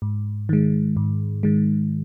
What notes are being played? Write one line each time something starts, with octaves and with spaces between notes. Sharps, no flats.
G#2
D#3 G#3
G#2
D#3 G#3